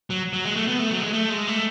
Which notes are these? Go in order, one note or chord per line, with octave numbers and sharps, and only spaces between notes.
F#3
F#3
G#3
A3
B3
A3
F#3
A3
G#3
A3
G#3
A3